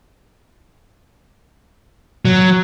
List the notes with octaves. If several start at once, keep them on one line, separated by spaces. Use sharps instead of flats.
F#3